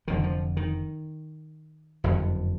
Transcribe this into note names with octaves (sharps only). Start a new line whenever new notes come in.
F1 F2 D3 D#3
F3
D#3
F#1 F2 D3